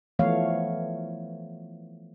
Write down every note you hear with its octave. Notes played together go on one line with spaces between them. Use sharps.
E3 F3 A3 B3 C#5 F5